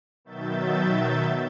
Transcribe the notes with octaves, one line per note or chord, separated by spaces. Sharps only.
B2 D#3 F#3 E5 G6 A6